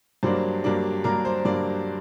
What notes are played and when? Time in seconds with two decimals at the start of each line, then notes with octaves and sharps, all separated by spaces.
0.23 G2 F#3 A#3 D4 C5
0.64 G2 F#3 A#3 D4
1.04 G2 F#3 A#3 D4 A#4
1.25 C5
1.45 G2 F#3 A#3 D4 D5